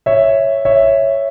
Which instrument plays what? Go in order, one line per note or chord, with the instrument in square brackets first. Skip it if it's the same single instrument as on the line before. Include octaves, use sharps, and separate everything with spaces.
[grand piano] C#5 E5
C#5 E5